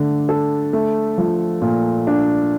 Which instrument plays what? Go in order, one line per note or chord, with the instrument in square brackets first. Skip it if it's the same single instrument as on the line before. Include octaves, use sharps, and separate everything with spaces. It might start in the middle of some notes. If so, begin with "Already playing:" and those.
Already playing: [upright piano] D3 A3 D4
A4
A3
F3
A#2
D4